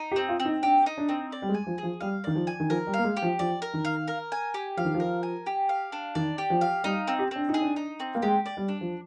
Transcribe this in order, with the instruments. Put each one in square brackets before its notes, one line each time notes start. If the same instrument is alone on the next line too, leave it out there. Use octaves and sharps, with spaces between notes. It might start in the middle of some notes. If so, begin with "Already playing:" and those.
Already playing: [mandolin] D#4
[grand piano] G4
[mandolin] C4
[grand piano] F4
[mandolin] C4
[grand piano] D#4
[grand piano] D4 [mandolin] G4
[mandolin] D#4
[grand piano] D4
[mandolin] C4
D5
[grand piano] G3
G#3
[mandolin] G#5
[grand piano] F3
[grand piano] F3 [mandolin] G#4
[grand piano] G3 [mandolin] F5
[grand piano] D#3 [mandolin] D5
[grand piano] F3
[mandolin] G#5
[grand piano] D#3
[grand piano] F3 [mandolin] A#4
[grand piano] G3
[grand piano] A#3 [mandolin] F5
[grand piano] G#3
[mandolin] G4
[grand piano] F3
[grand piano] F3 [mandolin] D5
[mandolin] A#4
[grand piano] D#3
[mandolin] F5
A#4
G#5
G4
[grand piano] F3 [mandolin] F5
[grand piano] D#3
F3
[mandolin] A#4
G#5
G4
F5
D4
[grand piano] D#3 [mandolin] D5
[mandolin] G4
[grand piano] F3
[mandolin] F5
[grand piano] G3 [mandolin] D#4
[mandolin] C4
[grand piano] G4
[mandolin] C4 [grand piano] D4
[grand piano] D#4
[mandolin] G#4
[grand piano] D4
[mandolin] D#4
C4
[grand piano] A#3
[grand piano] G#3 [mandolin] G4
[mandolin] D5
[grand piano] G3
[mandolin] D4
[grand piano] F3